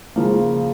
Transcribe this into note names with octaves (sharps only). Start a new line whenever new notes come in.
C#3 F3 A#3